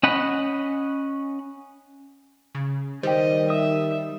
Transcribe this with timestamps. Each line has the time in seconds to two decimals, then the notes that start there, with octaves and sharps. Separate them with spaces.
0.03 C#4 D#5 F#5 B5
2.55 C#3
3.03 D#3 G3 C5 D#5 G5
3.50 E5 D#6